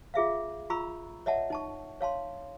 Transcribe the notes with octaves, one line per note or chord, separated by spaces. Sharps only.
F4 G#4 E5 F5
F4 A#5 B5 C#6 E6
C#5 D#5 E5 F#5 A5
D#4 A5 C#6
C#5 F5 A5 C6